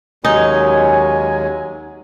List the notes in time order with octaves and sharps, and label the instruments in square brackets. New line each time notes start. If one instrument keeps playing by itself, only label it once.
[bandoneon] D#2 F#3 G#3 [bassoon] C#4 [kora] D#4 [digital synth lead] G#5